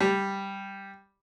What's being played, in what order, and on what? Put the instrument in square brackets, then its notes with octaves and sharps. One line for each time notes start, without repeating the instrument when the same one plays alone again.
[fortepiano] G3